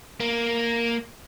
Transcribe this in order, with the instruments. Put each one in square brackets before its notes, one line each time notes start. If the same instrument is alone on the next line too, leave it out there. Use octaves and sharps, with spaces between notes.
[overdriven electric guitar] A#3